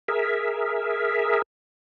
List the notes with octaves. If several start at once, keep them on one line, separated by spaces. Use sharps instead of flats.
G#4 A#4 E5